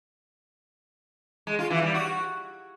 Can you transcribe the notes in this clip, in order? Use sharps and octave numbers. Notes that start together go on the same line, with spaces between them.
G#3
F4
E3
G3
F#4